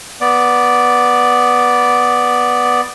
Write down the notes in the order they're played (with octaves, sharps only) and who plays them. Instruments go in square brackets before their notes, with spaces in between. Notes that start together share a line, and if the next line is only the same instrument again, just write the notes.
[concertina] B3 D5